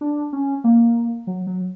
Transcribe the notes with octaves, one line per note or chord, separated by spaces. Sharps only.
D4
C#4
A#3
F#3
F#3